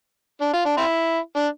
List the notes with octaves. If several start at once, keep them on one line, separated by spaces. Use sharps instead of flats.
D4
F4
D4
C4 E4
D4